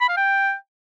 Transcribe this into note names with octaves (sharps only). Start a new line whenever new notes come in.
B5
F5
G5